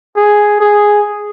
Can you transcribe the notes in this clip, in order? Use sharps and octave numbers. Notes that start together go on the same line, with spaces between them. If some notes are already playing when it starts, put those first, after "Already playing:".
G#4
G#4